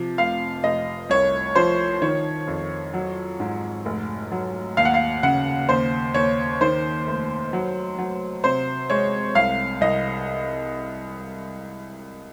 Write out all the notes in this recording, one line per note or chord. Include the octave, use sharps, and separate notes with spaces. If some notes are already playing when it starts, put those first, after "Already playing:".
Already playing: C3 F3
F1 F5
F1 D#5
C2 C#5
F3 C5
D#3 C#5
F2
F#3
G#2
F1
F#3
D#2 F5
F#5
F5
C#3 F#5
D#2 C5
D#2 C#5
D#3 C5
F1
F#3
F#3
C3 C5
G#3 C#5
C2 F5
C2 D#5